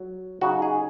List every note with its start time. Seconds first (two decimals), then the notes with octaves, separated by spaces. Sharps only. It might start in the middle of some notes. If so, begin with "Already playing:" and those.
Already playing: F#3
0.41 C#3 F#3 D#4 F#4
0.62 G#4